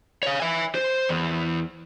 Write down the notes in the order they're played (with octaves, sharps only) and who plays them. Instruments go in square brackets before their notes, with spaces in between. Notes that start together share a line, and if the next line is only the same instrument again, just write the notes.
[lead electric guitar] C#5 F5
E5 G#5
C5
E2